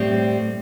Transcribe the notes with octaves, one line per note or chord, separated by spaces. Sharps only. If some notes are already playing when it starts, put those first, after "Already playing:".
Already playing: A2 G3 C4